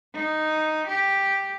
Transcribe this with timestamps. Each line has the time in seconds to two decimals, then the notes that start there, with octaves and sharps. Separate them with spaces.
0.14 D#4
0.88 G4